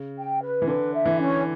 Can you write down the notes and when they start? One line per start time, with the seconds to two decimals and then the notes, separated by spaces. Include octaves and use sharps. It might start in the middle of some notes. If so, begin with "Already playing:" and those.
Already playing: C#3
0.18 G5
0.42 B4
0.62 E3
0.67 D3 B4
0.93 E5
1.05 E3
1.19 C#4